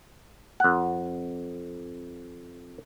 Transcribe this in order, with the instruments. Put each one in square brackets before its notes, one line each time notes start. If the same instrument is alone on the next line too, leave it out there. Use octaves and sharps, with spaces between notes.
[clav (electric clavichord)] F2 F#5